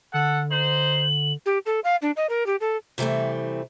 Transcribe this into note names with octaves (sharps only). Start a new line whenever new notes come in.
D3 A4 F#5
D#4 C5 F#7
G4
A4
F5
D4
D#5
A#4
G4
A4
C3 E3 G3 A3 C4